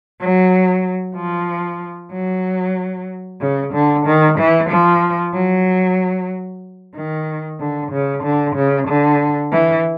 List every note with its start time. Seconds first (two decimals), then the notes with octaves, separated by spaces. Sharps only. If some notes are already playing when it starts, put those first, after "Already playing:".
0.19 F#3
1.15 F3
2.12 F#3
3.40 C#3
3.73 D3
4.05 D#3
4.37 E3
4.69 F3
5.33 F#3
6.95 D#3
7.59 D3
7.91 C#3
8.23 D3
8.55 C#3
8.87 D3
9.51 E3